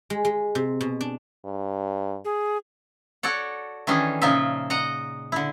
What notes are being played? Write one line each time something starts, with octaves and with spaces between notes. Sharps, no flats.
G#3
G#3
C3
B2
D4
G2
G#4
F#4 A4 C#5 D5 F#5
D#3 E3 C#4 D4 G#4 A4
A#2 C#3 F3 D#4 F4 E5
D#5 F#5 A#5
D3 E4